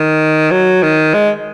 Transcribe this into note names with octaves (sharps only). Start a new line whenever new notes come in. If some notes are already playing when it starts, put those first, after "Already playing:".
Already playing: D#3
F#3
D#3
G#3